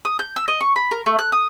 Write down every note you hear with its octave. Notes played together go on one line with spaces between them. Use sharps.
D#6
G6
E6
D#5
C#6
B5
A#4
A3
F#6
D#6